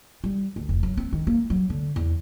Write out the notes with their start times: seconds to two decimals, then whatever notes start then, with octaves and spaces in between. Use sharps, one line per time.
0.24 G3
0.56 D2
0.69 F1
0.83 F#2
0.97 C4
1.13 D#3
1.27 A#3
1.50 F#3
1.70 D3
1.96 E2